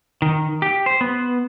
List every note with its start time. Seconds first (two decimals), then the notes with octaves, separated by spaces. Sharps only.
0.22 D#3
0.62 G4
0.86 C5
1.01 B3